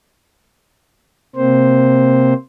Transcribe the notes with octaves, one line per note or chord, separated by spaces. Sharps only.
C3 A#3 C4 C5